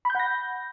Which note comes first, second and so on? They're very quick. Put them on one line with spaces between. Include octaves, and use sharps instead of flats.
B5 G6 F#5 A#6